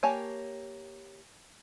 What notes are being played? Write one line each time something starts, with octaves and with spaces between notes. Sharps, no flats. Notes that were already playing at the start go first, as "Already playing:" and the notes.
A#3 G4 C#5 G#5 A5